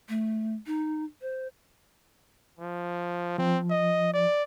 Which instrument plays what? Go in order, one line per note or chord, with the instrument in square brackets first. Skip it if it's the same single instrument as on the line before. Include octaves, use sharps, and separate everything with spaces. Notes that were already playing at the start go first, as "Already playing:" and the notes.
[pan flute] A3
D#4
C5
[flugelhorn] F3
[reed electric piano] F3 [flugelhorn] C4
[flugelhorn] D#5
D5